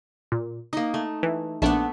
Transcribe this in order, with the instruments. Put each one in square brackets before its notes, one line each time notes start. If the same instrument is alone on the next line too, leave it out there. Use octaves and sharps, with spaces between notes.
[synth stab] A#2
[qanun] A#3 D#4 [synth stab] D#6
[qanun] A3
[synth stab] E3
[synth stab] A#1 D4 F#5 [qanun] A3 B3 E5